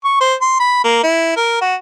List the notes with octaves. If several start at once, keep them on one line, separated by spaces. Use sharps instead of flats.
C#6
C5
C6
B5
A#3
E4
A#4
F#4